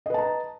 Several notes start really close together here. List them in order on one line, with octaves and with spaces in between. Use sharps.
D#5 B4 A5 A#5